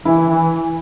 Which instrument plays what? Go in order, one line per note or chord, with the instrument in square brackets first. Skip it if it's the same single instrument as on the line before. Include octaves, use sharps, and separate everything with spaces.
[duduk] E3 [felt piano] E4
[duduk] E3